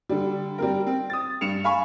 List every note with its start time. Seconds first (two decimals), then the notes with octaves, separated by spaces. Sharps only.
0.09 D3 G3
0.58 G3 C4 A#4
0.87 C4
1.10 D#6 A6
1.41 G2 C#7 E7 F7
1.64 F5 G#5 B5 C#6